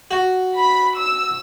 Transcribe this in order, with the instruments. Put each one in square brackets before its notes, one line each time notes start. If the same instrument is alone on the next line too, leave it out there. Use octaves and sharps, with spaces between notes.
[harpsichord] F#4
[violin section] B5
E6